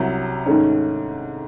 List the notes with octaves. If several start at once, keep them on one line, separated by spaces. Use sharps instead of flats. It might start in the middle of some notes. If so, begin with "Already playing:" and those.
Already playing: C2 C3 F#3
G#2 D#3 A3 C#4